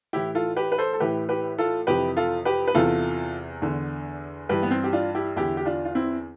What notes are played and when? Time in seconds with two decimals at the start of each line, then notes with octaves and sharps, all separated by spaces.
0.13 A2 E3 E4 G4
0.35 F4 A4
0.57 G4 B4
0.72 B4
0.78 A4 C5
0.93 A4
1.00 A2 E3 G4 B4
1.29 G4 B4
1.58 F4 A4
1.87 F2 C3 E3 G4 B4
2.17 F4 A4
2.45 G4 B4
2.68 B4
2.74 E2 C3 E3 F4 A4
3.62 E2 D3
4.49 G2 E3 G4 B4
4.63 B3
4.71 C4
4.84 G4
4.93 D4 F4
5.15 E4 G4
5.36 E2 D3 E4 G4
5.57 G4
5.66 D4 F4
5.85 F4
5.95 C4 E4